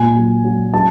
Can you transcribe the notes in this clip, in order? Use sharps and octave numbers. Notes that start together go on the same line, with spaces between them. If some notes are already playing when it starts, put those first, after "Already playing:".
Already playing: A#2 G#5
F#3
F#3
F#3 A5